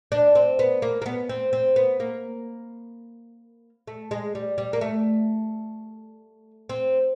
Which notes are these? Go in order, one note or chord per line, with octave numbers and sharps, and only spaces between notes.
D4
C4
B3
A#3
A#3
B3
C4
C4
B3
A#3
A3
G#3
G3
G3
A#3
A3
C4